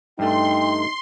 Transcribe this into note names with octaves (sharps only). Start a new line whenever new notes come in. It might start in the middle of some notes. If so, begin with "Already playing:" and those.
G2 A3 D#4 G5 C6